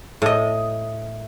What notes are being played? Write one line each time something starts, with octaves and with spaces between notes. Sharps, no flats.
A2 D#5